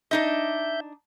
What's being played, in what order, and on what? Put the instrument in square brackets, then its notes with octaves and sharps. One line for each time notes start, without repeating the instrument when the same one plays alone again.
[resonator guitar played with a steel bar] D4 D#4 D#5 [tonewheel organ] E5 G6